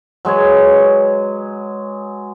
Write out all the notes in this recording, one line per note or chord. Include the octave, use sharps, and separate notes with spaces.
F#3 G#3 B4 C#5